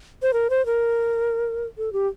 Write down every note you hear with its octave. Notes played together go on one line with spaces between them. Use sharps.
C5
A#4
C5
A#4
A4
G4